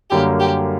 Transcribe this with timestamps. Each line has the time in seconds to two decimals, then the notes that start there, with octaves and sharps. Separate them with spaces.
0.10 F#2 D3 G3 A#3 G4
0.39 G4